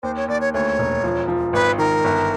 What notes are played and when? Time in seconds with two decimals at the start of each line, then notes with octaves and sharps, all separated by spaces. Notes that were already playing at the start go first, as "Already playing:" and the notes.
0.03 D#2 C5
0.16 C#5
0.28 D#2 D5
0.41 C#5
0.54 D2 C#5
0.79 E1
1.04 F3
1.28 F3
1.53 G#1 B4
1.78 D#3 A#4
2.04 G1